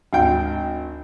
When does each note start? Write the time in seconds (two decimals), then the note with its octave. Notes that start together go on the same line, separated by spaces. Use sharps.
0.13 G#1 D2 G5